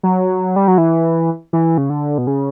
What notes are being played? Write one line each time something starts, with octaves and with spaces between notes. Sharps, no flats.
F#3
G3
F#3
E3
E3
C#3
D3
B2
C#3